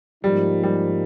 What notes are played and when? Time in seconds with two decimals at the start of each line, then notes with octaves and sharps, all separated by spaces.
0.23 G#2 F3 G3 A#3 D#4
0.63 G3